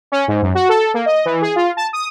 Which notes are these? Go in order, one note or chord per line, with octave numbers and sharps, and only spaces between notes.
C#4
G#2
F#2
F#4
A4
A#3
D#5
E3
G#4
F4
A5
D#6